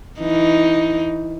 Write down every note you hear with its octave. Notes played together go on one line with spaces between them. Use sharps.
E3 D#4